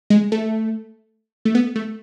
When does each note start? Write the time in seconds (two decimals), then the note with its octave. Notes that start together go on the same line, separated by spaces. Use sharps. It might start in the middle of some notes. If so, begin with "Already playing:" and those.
0.10 G#3
0.32 A3
1.45 A3
1.55 B3
1.76 A3